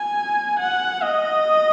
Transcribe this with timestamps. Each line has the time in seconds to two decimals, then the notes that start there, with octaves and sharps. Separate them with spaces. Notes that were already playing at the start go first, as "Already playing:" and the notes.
Already playing: G#5
0.59 F#5
1.02 D#5